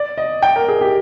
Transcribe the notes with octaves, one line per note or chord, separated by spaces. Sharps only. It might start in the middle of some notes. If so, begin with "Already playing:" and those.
Already playing: D5
D#5
G5
A#4
G#4
G4